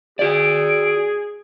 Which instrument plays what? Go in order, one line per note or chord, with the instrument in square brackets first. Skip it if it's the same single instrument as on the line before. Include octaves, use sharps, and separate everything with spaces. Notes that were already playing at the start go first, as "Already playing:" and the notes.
[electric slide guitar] F#4 D5 [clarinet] G#4 [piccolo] D7